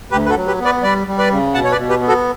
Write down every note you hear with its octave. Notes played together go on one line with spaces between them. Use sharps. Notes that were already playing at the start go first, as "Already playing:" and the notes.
D2 G4 B4
B4
F#4 A4
F#3
G4 B4
B3
B4 D5
G3 B4 D5
G3
B4 D5
C#3
B2 F#5 A5
C#5
B4 D5
B2
G4 B4
B3
F#4 A4